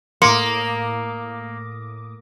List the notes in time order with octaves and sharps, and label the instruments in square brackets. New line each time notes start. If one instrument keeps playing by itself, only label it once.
[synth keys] A2 D6 D#6 [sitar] A#3 [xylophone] C6 C#7